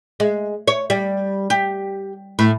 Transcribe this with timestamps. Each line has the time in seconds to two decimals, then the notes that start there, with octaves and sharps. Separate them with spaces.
0.20 G#3
0.68 C#5
0.90 G3
1.50 G4
2.39 A2